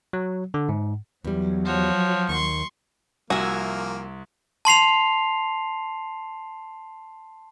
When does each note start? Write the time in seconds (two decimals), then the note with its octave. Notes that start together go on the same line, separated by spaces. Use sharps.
0.13 F#3
0.54 D3
0.69 G#2
1.25 E2 F#3 G3
1.65 F3 F#4 C#5
2.29 D#2 C6 C#6
3.30 C2 F3 A#3 F#4 E5 G#5
4.65 A5 C6 C7 F7